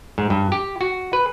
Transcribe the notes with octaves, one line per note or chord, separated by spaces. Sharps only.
G#2
G2
G4
F#4
B4